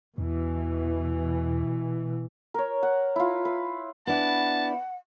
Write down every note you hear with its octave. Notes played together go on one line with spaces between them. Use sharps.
E2 B2 E3
A#4 C#5
F#5
E4 F4
B4
B3 D4 E4 B4 F#5 A5